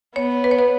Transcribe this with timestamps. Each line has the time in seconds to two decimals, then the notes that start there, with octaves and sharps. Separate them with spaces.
0.16 B3 C#5
0.44 B4
0.51 C#5
0.59 B4